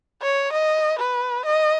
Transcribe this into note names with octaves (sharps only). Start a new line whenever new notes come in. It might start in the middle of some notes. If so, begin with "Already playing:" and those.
C#5
D#5
B4
D#5